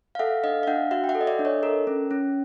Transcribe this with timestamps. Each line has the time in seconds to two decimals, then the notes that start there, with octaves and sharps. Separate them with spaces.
0.15 F5
0.19 A4 E5 F#5
0.44 D4 D#5 F5
0.63 F5
0.67 D4 E5 F#5
0.91 F#4 E5 F#5
1.04 G5
1.09 E5 F#5
1.15 A4
1.21 D#5
1.27 D5 E5
1.39 D4
1.45 C#5 D#5
1.63 A4 A#4
1.87 C#4
2.11 C#4